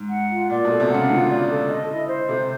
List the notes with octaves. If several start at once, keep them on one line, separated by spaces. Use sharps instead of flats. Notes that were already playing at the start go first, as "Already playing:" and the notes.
Already playing: G#2
F#5
F4
A#2 D5
B2 A4
C3
C#3 F#5
D3 F4
D5
A4
D#5
E4
C5
C3 A4